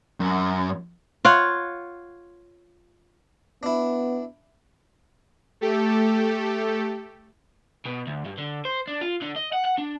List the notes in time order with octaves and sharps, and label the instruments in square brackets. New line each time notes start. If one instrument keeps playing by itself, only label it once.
[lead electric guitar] F#2
[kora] F4 C#5 F#5
[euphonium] B3 [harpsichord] D4 E4
[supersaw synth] A3 G4 A4
[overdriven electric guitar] B2
D2
G2
D3
C5
D4
F4
D3
D#5
F#5
F#5
D4